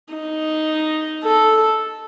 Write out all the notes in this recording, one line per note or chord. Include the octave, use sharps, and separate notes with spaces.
D#4
A4